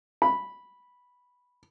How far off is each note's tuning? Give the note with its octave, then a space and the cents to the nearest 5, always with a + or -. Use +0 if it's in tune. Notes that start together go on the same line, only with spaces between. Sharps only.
B5 -5